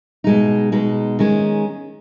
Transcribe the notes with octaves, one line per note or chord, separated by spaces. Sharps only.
B2 G#3 D#4
B2 G#3 D#4
D#3 G#3 C#4